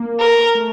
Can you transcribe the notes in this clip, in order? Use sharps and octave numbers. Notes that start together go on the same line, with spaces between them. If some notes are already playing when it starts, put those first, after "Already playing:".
Already playing: A#3
A#4
A3